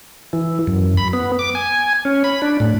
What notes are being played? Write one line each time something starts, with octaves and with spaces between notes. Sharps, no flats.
E3
F#2
B5
B3
D6
G#5
C#4
B5
D4
A2